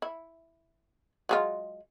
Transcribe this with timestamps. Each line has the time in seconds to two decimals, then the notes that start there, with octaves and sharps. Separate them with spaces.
0.02 E4
1.29 F#3 G#3 F4